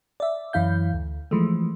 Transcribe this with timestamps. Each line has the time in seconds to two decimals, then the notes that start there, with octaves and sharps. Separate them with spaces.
0.20 D5 E5
0.53 F#2 E3 E4 F5 G6
0.94 D2
1.31 E3 F3 G#3 A3